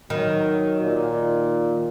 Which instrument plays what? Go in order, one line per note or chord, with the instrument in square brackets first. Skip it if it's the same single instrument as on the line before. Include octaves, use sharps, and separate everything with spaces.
[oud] D#3 [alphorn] F#3
[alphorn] A#2